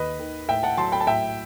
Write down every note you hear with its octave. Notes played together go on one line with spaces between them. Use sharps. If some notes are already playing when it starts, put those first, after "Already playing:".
Already playing: D#2 B4 D#5
D#3
A2 E5 G5
F#5 A5
F#3 A5 C6
G5 B5
A5
A2 E5 G5